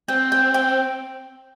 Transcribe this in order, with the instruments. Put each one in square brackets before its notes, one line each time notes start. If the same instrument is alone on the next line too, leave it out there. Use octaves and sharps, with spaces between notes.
[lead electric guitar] C4 [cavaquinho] G5
[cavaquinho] G5
G5